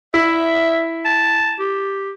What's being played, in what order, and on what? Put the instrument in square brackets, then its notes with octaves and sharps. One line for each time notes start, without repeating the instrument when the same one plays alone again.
[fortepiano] E4 [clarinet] E5
[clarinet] A5
G4